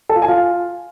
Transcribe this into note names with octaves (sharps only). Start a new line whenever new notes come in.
A4
F4
G#5
F4